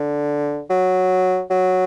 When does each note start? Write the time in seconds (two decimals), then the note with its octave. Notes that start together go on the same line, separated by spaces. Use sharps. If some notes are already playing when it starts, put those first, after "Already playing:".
Already playing: D3
0.70 F#3
1.50 F#3